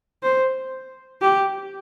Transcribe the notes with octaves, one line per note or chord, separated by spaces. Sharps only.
C5
G4